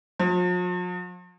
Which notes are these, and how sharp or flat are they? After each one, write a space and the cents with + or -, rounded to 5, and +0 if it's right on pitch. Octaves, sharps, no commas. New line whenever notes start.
F3 +45